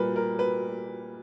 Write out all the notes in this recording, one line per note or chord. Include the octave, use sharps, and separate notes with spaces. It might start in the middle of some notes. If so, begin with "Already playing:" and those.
Already playing: A#2 G3 A#4 B4
A#4
B4